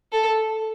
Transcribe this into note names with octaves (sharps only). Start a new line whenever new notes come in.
A4